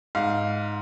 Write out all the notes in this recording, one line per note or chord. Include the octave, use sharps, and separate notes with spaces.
G#2 F5